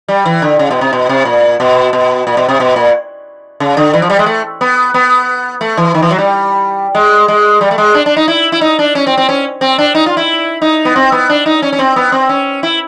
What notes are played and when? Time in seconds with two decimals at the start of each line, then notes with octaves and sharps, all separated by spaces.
0.08 G3
0.25 E3
0.42 D3
0.59 C#3
0.71 B2
0.81 C3
0.93 B2
1.09 C3
1.25 A#2
1.60 B2
1.93 B2
2.27 A#2
2.37 B2
2.48 C3
2.60 B2
2.76 A#2
3.60 C#3
3.77 D3
3.93 E3
4.02 F3
4.10 G3
4.19 G#3
4.26 A3
4.61 B3
4.94 B3
5.61 A3
5.77 E3
5.95 D#3
6.02 E3
6.11 F#3
6.18 G3
6.95 G#3
7.28 G#3
7.61 G3
7.71 A3
7.78 G#3
7.94 D4
8.06 D4
8.17 D#4
8.28 E4
8.52 E4
8.61 D#4
8.79 D4
8.95 C#4
9.07 C4
9.17 C4
9.29 C#4
9.61 C4
9.78 D4
9.95 D#4
10.06 F4
10.17 E4
10.62 D#4
10.85 B3
10.96 C4
11.12 B3
11.29 D4
11.46 D#4
11.62 C#4
11.73 C#4
11.79 C4
11.96 B3
12.12 C4
12.29 C#4
12.63 E4